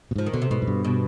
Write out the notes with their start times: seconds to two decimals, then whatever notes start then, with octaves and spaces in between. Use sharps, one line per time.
0.11 B2
0.16 G#2 F3
0.26 D#3
0.33 B2 D3
0.42 C3
0.50 G#2 B2
0.62 G#2
0.67 G2
0.84 B2